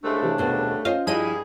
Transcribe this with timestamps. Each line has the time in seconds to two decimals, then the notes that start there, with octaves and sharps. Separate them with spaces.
0.04 C2 C#3 G#3 A3 D4
0.23 C3 E3
0.38 D#2 B2 A3 B3
0.85 C#4 F4 C5 D#5 F5
1.07 G2 F3 E4 G#4 D#5 F5 D#7